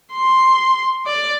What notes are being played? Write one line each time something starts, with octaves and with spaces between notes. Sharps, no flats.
C6
D5